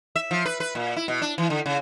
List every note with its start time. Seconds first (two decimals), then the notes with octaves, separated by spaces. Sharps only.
0.16 E5
0.31 F3
0.45 B4
0.60 B4
0.75 A#2
0.96 E4
1.08 B2
1.22 D4
1.38 E3
1.50 D3
1.66 C#3